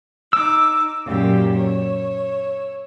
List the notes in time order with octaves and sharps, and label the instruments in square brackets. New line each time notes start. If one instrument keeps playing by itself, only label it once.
[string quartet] D#4 D6 [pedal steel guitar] E6
[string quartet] F#2 A#2 G4
C#5